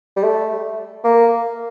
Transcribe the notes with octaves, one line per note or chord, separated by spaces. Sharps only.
G3
A3
A#3